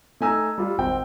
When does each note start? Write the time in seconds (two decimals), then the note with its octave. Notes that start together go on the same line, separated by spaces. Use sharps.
0.21 A3 D#4 G#5 A#5 E6
0.58 G3 F4
0.78 G#1 C4 G5